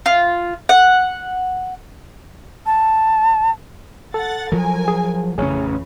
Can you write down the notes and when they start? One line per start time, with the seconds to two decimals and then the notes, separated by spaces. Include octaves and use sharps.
0.06 F4
0.69 F#5
2.66 A5
4.14 A4 F#5 A6
4.52 F3 F#3 A#4 G#5
4.88 G#4
5.38 A1 F2 C#3 E3 C#4 G#4 C#5